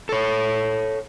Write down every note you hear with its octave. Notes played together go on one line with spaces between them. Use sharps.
A4 C#5